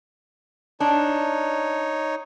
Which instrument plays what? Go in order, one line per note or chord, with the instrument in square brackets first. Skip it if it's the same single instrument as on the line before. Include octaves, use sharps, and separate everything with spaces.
[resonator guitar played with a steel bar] D4 [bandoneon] D#4 C#5